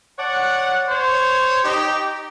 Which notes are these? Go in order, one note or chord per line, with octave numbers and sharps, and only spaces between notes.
C#5 D5 F#5
C5 C#5
D#4 G4